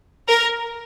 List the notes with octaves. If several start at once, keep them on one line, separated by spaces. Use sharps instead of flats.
A#4